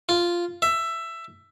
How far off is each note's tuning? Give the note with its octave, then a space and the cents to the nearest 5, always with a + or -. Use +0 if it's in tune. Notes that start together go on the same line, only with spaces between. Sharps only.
F4 -5
E5 +15